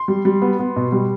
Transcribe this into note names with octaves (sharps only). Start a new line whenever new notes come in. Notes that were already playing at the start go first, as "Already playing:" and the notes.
Already playing: C6
G3
G3
B3
B3
B2
G3